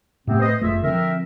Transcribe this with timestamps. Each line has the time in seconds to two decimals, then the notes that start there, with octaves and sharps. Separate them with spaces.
0.27 A2 C3 A3 B3 C4
0.40 B4 C5 D#5
0.62 F#1 F2 A3 F4 G#4 E5
0.83 D3 F3 C4 A#4 E5